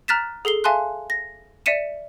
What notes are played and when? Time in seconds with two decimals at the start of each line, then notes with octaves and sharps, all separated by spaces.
0.08 A#5 F6 F#6 A6 B6 E7
0.45 G#4 A4 C7 G7
0.64 E5 F5 G#5 A5 C6 F#6
1.10 A#6
1.66 D5 E5 B6 C#7 D#7 E7